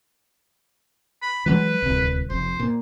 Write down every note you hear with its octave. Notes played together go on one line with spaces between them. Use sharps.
B5
E3 F#3 G#3 B4
D1 C2
F1 C5
A#2